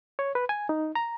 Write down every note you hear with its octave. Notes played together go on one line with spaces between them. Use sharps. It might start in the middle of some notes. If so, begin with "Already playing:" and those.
C#5
B4
G#5
D#4
A#5